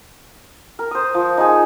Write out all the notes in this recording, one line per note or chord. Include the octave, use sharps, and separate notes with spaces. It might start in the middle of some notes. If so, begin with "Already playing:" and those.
A#4
C5 D#6
F3
D#4 G#4